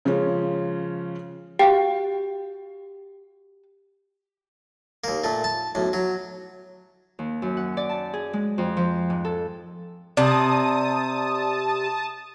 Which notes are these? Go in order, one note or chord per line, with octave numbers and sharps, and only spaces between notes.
C#3 F3 G#3 C#4
F#4 G4 F5 G5
D#2 A#3
A#2 A3
A5
B1 A2
F#3
D#2
F#2
F#5
D5
A5
G#4
G#3
F2
F3
G#2
A4
C3 D5 A5 D#6